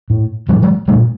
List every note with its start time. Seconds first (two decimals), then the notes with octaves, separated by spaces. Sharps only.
0.10 A2
0.49 A2 F3 G3
0.62 F#3 G#3
0.88 A#2 G3 A3